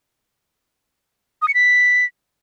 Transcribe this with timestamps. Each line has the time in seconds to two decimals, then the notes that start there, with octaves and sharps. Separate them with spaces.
1.42 D#6
1.48 C#7
1.54 B6